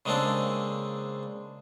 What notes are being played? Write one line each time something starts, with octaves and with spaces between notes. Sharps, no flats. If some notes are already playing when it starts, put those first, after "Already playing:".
C#3 G#3 A#3 C4 D4 A4